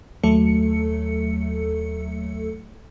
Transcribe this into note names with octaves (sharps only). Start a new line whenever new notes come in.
D#2 F#3 A3 A4 C#7